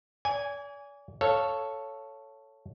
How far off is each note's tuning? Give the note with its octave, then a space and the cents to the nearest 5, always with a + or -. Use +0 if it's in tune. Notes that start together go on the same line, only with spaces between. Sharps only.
D5 -40 G#5 -5
A4 +0 C#5 +0 F5 +0